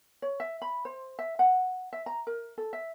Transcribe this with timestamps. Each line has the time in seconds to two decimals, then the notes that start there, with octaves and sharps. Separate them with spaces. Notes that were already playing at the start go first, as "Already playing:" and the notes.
0.22 C#5
0.40 E5
0.62 B5
0.85 C5
1.19 E5
1.39 F#5
1.93 E5
2.06 A#5
2.27 A#4
2.58 A4
2.73 E5